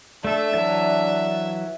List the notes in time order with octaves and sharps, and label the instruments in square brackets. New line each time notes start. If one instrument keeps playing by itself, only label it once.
[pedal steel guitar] A3 A4 [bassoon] D4 [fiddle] E5
[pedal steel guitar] E3 F#3 A5